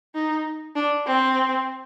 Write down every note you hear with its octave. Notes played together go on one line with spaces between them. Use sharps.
D#4
D4
C4